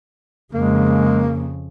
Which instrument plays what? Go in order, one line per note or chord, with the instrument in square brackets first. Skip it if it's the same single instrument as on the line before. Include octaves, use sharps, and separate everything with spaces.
[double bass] F2 C#3 [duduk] G#3 [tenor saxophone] A#3